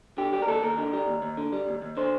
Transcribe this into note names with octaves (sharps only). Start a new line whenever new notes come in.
D3 G4
G3 G4
A#4
D#2 A4
D#2 A#4
D3
G3
D#2
D#2
D3
G3
D#2
D#2
D3 C5